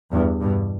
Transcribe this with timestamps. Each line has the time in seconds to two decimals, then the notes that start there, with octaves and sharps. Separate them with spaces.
0.12 E2 G2
0.42 G2 B2